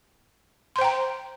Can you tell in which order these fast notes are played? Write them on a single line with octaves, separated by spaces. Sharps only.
C6 C5 G5 A#5